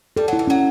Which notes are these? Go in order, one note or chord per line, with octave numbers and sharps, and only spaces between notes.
G3 A4
F#3 E4
E3
F#3 C#4